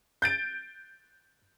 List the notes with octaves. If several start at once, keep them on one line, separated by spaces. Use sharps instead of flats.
G6 A6 D7